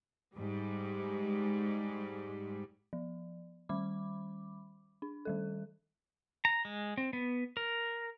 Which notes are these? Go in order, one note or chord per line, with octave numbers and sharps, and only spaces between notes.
G#2 G3
F3
D#3 G3 B5 D6
D4
D#3 G3 A4
A#5
G#3
C4
B3
A#4